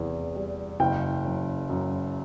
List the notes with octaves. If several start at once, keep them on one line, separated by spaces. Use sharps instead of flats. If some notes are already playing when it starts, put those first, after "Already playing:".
Already playing: E2 C3 G3
G3
F#1 G5
F#2
F#2